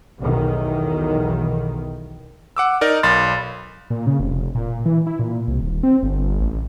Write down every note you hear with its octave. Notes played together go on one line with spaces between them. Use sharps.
B1 E2 D#3
F#5 D6 E6
D#4 A#4 D5
B1 B5 C6 A6
A#2
C#3
F1
A#2
E3
E4
A#2
C2
D#1
C4
G1
A1